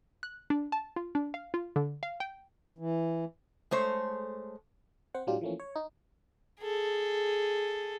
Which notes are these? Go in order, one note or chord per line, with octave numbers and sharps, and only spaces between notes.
F#6
D4
A5
F4
D4
F5
F4
D3
F5
G5
E3
G#3 A3 C5 C#5
C4 C5 F#5
A2 F#3 G3 D4 F4 G4
E3 F3 A3 A#3 C#4
C#5
D#4
G#4 A4